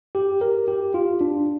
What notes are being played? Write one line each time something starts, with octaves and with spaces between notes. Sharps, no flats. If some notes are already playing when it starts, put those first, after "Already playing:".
G4
A#4
G4
F4
D4